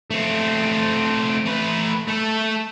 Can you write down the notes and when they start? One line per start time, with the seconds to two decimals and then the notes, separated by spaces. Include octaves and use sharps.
0.11 A3 C4
1.46 A3 B4
2.08 A3 A4